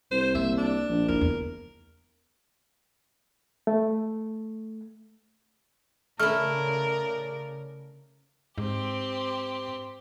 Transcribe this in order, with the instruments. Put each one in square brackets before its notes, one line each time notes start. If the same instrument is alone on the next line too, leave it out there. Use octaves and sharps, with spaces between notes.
[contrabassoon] C2 [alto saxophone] C5
[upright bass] A#3 [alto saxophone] E5
[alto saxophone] D4
[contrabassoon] A#1
[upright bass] E4 [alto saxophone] A#4
[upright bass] E2
[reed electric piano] A3
[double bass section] C#3 [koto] A3 E4 [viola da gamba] A#4 D5 [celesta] F6
[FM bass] G#2 [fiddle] C4 G4